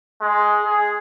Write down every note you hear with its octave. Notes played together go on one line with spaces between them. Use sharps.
G#3
G#4